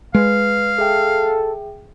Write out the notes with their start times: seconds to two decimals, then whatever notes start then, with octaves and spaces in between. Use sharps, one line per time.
0.14 G#3 B4 F5
0.78 G#4 A4 E5 G5